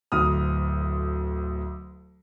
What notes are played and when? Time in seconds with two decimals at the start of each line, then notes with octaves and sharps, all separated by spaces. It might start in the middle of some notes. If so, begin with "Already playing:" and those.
0.12 D1 D2 D#6 F6